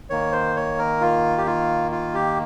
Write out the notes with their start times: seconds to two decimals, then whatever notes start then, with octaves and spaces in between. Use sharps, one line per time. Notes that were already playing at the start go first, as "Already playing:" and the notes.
0.10 D#3 A#3 C#5
0.32 C5
0.56 C#5
0.79 A#4
1.01 F4
1.38 G4
1.46 F4
1.91 F4
2.15 G4